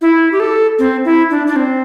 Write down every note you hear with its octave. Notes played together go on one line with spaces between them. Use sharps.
E4
G4
A4
C4
E4
D4
D4
C4